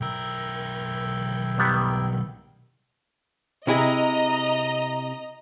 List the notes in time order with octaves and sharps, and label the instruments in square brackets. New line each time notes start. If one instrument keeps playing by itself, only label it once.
[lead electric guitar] B1 A#4 [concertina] E4 G5
[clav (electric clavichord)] D#3 G3 B3
[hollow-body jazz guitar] C3 E4 G#4 [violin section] D#5 A#5